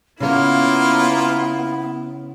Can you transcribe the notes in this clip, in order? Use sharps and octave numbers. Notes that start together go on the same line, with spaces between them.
C#3 A#3 B3 E4 F4 C#5